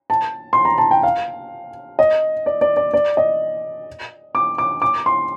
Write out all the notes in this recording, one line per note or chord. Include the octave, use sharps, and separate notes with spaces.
A5
C6
A#5
A5
G5
F5
D#5
D5
D5
D5
D5
D#5
D6
D6
D6
C6